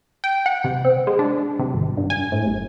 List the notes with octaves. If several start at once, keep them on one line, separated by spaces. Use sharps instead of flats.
G5
F#5
C3
C4
G#3
D4
C3
G#1
G2
G#5
A2
G1